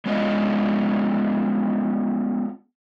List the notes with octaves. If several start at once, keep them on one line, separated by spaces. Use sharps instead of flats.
G#3 B3 C#4 D4 F4 D#5